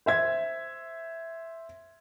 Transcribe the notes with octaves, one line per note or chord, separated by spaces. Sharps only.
C5 E5 G#6